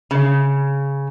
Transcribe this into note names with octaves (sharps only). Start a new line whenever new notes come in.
C#3